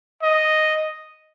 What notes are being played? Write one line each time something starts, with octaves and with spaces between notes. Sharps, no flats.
D#5